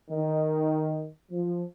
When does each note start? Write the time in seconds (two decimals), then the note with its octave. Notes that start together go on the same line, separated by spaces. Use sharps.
0.10 D#3
1.31 F3